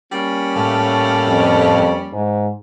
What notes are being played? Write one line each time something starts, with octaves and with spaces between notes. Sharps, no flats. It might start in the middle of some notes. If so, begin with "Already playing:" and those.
G3 A#3 C#4
A2 A3 F5
F2
G#2